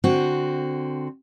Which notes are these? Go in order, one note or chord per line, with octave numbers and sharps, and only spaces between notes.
D3 C4 F#4